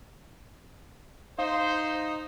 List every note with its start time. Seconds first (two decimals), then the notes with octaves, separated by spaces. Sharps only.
1.39 D#4 C5 F5